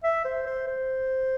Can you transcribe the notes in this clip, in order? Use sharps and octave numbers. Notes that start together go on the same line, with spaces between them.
E5
C5
C5
C5